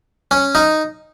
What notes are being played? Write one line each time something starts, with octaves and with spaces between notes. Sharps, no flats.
C#4
D#4